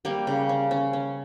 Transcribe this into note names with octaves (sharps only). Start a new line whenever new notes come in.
G3 A#3 G4
C#3
C#4
C#4
C#4